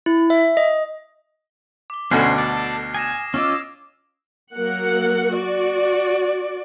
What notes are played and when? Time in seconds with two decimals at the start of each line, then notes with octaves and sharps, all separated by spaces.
0.06 E4
0.30 E5
0.57 D#5
1.90 D6 G7
2.11 D2 B2 D3 C#4 C5 F6 G#6 C7
2.38 A4 D5 F6 B6
2.94 G#5 D#6 A#6 E7
3.34 C#4 F4 D#5 D6 E6
4.54 F#3 A#3 A#4 F#5
5.32 F#4 D5